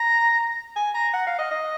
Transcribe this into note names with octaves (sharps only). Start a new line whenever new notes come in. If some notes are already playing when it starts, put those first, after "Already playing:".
Already playing: A#5
G#5
A#5
F#5
F5
D#5
D#5